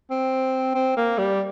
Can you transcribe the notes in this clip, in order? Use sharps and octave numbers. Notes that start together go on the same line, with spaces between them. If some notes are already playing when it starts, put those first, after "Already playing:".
C4
C4
A#3
G3